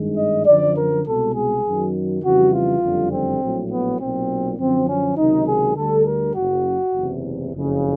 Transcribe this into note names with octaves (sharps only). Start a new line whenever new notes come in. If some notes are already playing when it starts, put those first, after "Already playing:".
Already playing: G#1 G2 D#3 G#3
D#5
F#2 D3 F3 D5
A#4
C2 B2 G#3 A4
G#4
F#2 D#3 F#3
F2 C#3 E3 G3 F#4
F4
F#1 F2 D3 G3
C4
A#1 A2 F#3
B3
B1 A#2 F#3 C4
F#2 D3 F3 C4
C#4
C#2 C3 D#3 F#3 D#4
G#4
D2 D3 G3 A4
A#4
F#1 F#2 C#3 F#4
F#1 E2 C3
F#1 F2 C#3